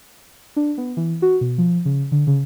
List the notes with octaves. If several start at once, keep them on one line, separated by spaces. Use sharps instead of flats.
D4
B3
E3
F#4
B2
F3
C#3
D3
C#3